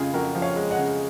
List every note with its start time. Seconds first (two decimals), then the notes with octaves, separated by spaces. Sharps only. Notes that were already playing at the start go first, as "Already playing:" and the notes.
Already playing: F2 C#3 G#3 F4 G#4
0.13 F2 F#4 A#4
0.35 F3
0.42 C#5 F5
0.56 G#3
0.71 D#5 F#5
0.78 C#3